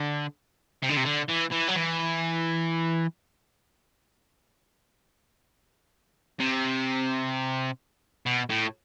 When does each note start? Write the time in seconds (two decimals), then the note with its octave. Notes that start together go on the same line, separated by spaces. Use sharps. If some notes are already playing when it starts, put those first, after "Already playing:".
Already playing: D3
0.83 C3
0.89 D3
0.96 C3
1.05 D3
1.28 E3
1.51 E3
1.68 F#3
1.75 E3
6.40 C3
8.26 B2
8.50 A2